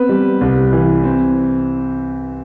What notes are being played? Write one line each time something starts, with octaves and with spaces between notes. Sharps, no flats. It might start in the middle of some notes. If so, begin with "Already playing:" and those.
Already playing: B3 C4 B4
G3
C2
E3
C4